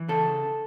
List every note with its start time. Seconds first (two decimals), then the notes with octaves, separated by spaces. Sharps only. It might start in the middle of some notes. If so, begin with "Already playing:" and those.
Already playing: E3
0.08 C#3 A4